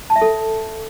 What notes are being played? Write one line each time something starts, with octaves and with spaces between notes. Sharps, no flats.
A5
E5
A4